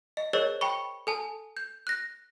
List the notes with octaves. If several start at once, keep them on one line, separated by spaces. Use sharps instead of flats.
D#5
G#4 A#4 C5 C#5 D#5
G5 B5 C#6
A4 G#5 A5
G6
F#6 A#6